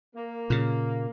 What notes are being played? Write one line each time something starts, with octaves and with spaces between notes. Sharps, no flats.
A#3
A#2 C#3